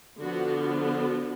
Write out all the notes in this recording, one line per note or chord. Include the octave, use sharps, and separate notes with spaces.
D3 F3 B3 F#4
F#4